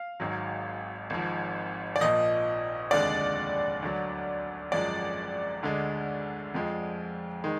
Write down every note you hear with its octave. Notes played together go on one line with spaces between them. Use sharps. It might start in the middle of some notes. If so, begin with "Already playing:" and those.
Already playing: F5
G#1 G#2 F#3
G#1 G#2 F3
D5
A#1 A#2 F3 D#5
F1 D#2 D3 G#3 D5
D2 D3 F#3
G#1 F#2 F3 G#3 D5
D2 D3 G#3
F2 F3 G#3
D#3 G#3